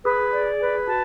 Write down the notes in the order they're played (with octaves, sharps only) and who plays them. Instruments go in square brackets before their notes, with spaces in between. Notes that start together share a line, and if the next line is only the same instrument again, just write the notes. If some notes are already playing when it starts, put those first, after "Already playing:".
[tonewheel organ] G#4 [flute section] B4
[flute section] D5
B4
[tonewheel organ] F#4 [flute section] A5